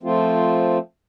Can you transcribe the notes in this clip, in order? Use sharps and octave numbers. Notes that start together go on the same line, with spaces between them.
F3 A3 C4 F4